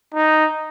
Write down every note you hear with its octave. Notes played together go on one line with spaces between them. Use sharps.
D#4